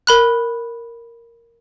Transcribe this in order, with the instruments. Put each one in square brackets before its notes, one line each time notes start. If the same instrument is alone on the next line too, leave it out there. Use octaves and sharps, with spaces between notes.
[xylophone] A#4 B5 F#6